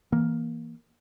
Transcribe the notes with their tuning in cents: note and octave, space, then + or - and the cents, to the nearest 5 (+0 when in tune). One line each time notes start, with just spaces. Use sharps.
E3 +0 A#3 +5